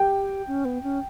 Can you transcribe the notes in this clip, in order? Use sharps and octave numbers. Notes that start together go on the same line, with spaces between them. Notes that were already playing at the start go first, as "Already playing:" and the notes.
Already playing: G4 G5
C#4
B3
C#4